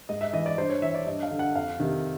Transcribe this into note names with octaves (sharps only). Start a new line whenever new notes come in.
G#2 D#5
E5
E3 D#5
D5
G2 C5
C#5
E3 E5
D5
G2 D#5
F5
D3
F#5
F2 F5
C3 D#3